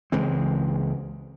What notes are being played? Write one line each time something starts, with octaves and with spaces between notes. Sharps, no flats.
C#2 E3 G#3 C4